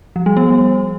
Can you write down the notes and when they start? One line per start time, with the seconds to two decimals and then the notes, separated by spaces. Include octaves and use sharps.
0.16 F3
0.26 G3
0.37 B3